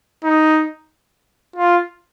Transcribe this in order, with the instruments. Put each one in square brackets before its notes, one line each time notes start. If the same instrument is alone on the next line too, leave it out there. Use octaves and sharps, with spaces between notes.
[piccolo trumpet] D#4
F4